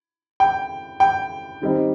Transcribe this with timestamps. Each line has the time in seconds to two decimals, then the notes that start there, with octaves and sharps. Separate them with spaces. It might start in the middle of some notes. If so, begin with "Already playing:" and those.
0.40 G5
1.00 G5
1.62 D#3 G3 C4 D#4